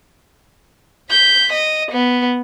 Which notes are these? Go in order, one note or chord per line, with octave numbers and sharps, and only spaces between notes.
G6 B6
D#5
B3